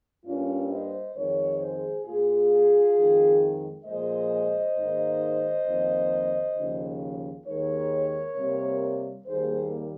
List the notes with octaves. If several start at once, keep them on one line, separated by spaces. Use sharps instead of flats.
G2 G3 A#3 C#4 F4
C5 D#5
F2 D#3 G#3 A#4 C#5
G#4 C5
A#2 G#3 F4 G#4
F2 D#3 G#3
A#2 F3 G#3 C5 D#5
G#2 D#3 A#3
F2 D#3 A#3
D#2 C#3 F3
D#2 D#3 G#3 A#4 C#5
C3 G3 A#3
D#2 D#3 G3 A#3 G#4 C5